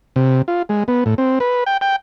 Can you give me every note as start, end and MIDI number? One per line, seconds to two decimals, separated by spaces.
0.16 0.42 48
0.48 0.62 65
0.69 0.84 56
0.88 1.04 59
1.06 1.15 45
1.18 1.39 60
1.40 1.64 71
1.66 1.77 79
1.81 1.96 79